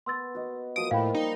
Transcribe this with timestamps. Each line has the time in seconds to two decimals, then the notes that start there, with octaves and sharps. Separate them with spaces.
0.06 B3 C6 E6 A6
0.35 F#4 D#5
0.76 F3 A#3 F#4 D#6 D7
0.91 A2 F5 G5 B5
1.15 G3 D#4 G4